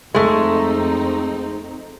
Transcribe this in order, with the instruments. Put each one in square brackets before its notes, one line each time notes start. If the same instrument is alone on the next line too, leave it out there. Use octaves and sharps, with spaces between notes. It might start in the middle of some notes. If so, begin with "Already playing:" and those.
[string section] F2 C4 D#4 [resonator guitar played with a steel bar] G#3 A3